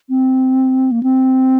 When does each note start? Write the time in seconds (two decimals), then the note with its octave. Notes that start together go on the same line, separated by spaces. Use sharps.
0.09 C4
0.91 A#3
1.03 C4